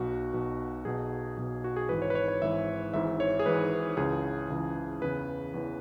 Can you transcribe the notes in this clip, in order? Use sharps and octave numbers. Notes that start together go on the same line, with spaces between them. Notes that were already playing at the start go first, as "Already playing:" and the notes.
Already playing: B1 B2 F#4
B1 B2
B1 B2 G#4
B1 B2
F#4
G#4
G#1 G#2 E3 B4
C#5
B4
C#5
C#5
G#1 G#2 E3 E5
G#1 G#2 E3 E5
C#5
G#4
G#1 G#2 E3 B4
C#2 C#3 E3 G#4
C#2 C#3 E3
E2 C#3 E3 B4
E2 C#3 E3